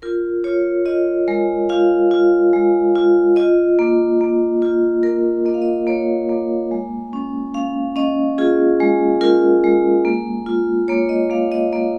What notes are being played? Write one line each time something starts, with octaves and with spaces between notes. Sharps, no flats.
F4 A#4
F4 C#5
F4 D#5
G#3 A#4
F4 F5
F4
G#3
F4
F4 D#5
A#3
A#3
F4
A#3 A#4
A#3 D#5
F5
D#5
A#3 C#5
A#3
G#3
C#4
C#4 F5
C#4 D#5
F4 G#4
G#3
F4 A#4
G#3
A#3
F4
A#3 C#5
D#5
A#3 F5
D#5
A#3 D#5